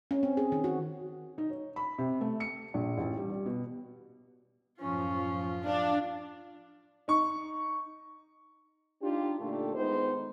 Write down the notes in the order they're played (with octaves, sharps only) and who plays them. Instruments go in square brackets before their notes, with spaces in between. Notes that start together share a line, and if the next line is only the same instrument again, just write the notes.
[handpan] C#4
C4
G#4
D#3
F#4
[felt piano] D#4
C#5
B5
C3
A3
C#7
A#1
A1
G3
G3
B2
[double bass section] F#2 A2 F3 [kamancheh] C#4 [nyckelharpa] F4
[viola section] D4 [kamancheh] F5
[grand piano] D#4 C#6
[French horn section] D4 D#4 F4 G4
A#2 D3 A3 D#4 G4 A4
D#3 G#3 B3 D#4 C5